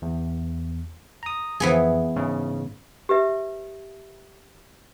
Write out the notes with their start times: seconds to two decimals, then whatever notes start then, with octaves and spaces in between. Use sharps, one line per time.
0.02 E2
1.23 A#5 D#6
1.60 F2 E3 B3 G#4
2.16 G#2 C#3
3.09 G4 B4 E5